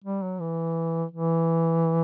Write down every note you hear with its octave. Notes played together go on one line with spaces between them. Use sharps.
G3
F#3
E3
E3